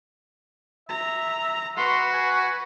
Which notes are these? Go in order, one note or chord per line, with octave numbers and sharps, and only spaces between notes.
E5 A#5
F#4 B4 C6
G#5